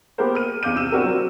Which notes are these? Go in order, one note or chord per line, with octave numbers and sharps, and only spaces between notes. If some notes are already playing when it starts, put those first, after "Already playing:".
A#3 B3 G4 G#4 A#4 C5
F6 D#7
E2 F5 D6 G6 D#7
C3 E6 E7
B3 C4 D4 F#4 G4 A#4
F#3 C4